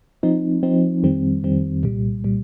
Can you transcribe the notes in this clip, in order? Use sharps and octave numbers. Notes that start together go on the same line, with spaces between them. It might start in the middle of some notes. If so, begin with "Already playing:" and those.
F3 C4 D#4
F3 C4 D#4
F2 D#3 G3 C4
F2 D#3 G3 C4
C2 A#2 G3
A#2 G3